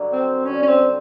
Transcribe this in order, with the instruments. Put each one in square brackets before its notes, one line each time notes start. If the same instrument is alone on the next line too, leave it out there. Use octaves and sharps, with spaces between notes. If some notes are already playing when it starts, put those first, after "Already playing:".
Already playing: [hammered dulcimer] G2 D3 F#3
[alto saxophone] C4
[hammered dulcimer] G2 D3 F#3 [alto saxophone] C#4
[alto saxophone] C#4
C4